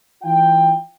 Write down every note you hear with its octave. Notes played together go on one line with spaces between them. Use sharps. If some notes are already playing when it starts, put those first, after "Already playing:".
E3 F4 G5